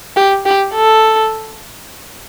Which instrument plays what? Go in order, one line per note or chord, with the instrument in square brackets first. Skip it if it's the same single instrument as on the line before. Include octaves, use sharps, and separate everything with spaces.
[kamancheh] G4
G4
A4